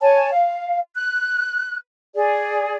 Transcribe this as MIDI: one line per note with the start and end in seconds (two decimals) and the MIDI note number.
0.01 0.29 73
0.01 0.29 80
0.01 0.29 81
0.31 0.79 77
0.96 1.75 90
2.15 2.77 68
2.15 2.77 74